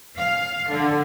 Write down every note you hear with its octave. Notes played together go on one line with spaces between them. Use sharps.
F5
D3